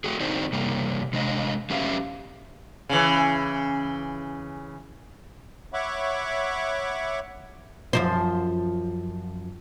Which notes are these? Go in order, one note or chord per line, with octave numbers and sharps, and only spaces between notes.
A3 F#4 G#4
C4 D4 D#4 F#4 G#4 C5
C3 G3 A#3
C3 G#3 D4 D#5
F#3 C#4 G4 B4 E5 F5
C#3 E3
C#5 E5 F#5 B5 C#6 D6
F#2 F3 C5